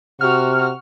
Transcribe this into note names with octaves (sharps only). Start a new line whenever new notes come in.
C3 F#4 F6